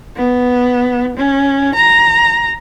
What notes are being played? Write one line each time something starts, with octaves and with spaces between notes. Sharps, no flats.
B3
C#4
A#5